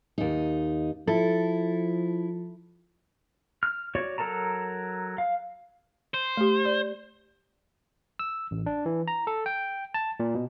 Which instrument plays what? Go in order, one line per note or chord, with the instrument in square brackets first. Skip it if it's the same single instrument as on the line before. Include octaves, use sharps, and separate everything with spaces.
[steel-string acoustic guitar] D#2 D#4
[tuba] F3 [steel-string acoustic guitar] E4 [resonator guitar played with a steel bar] A4
[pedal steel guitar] F6
F#4 C#5 D5
F#3 A4 A#4 A5 A#5
F5
[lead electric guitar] C5
[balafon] A3 G4
D5
[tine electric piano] E6
A1
D4
E3
A#5
A4
G5
A5
A#2
B2